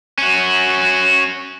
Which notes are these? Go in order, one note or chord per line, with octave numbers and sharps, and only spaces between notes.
C#4 F#4